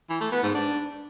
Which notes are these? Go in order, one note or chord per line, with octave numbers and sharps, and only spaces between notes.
E3
A3
B3
G#2
D4